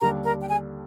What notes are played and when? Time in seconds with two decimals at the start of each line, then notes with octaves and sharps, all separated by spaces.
0.01 D#2 D3 G3 D4 G4 A#4 A#5
0.25 A#4 A#5
0.40 G5
0.48 G#4 G#5